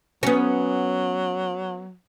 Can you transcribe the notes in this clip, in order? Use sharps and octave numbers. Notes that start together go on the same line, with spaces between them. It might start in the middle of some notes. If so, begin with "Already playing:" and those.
F#3 B3 C#4